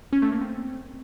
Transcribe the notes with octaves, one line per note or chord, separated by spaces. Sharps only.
C#4
A3
A#3
C4